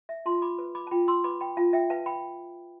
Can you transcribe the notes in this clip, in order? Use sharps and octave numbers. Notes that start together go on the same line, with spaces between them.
E5
F4 A5 C6
B5 D6
B4
B5 D6
A5
F4 G5 B5
C6 E6
B4 B5 D6
G5 B5
F4 F5 A5
E5 G5
B4 F5 A5
G5 B5